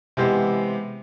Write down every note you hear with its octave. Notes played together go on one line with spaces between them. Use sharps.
C3 E3 G#3 B3 G4 C5